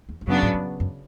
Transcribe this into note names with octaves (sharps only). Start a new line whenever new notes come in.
E2
G2
F#2 C#3 F#3 B3 D4
A2
G2
F#2